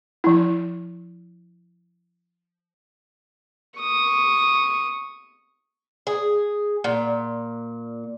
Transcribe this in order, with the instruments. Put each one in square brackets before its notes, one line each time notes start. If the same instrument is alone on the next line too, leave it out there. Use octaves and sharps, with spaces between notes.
[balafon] F3 E4
[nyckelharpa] C#6 D#6
[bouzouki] G#4
A#2